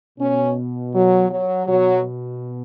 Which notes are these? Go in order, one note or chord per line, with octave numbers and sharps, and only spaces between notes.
B2 C#4
F#3
F#3
B2 F#3